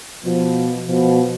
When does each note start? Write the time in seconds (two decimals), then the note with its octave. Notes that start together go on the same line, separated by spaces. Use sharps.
0.25 B2 F3
0.88 B2 F3